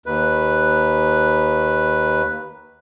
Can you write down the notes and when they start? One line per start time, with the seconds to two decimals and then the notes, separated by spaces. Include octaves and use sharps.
0.06 D#2 B4